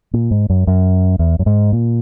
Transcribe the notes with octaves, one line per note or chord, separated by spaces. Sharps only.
A#2
G#2
F#2
F#2
E2
F#2
G#2
A#2